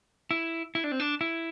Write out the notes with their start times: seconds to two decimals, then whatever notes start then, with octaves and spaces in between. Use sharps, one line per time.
0.31 E4
0.75 E4
0.84 D4
0.92 C4
1.00 D4
1.21 E4